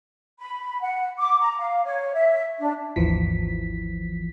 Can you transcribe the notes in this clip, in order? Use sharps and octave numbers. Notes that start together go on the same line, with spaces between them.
B5
F#5
D6
A#5
F5
C#5
E5
D4
G#1 D#2 E3 F3 B6